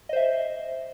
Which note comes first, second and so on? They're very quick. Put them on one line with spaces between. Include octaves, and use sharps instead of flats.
D#5 C5 E5